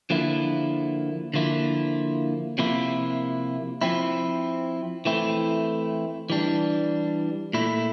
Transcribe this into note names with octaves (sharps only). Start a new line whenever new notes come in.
D3 F3 A#3 E4
D3 F3 A#3 E4
C3 F3 A#3 E4
F3 C4 E4
E3 A3 C4 E4
E3 G3 D4
A#2 A3 E4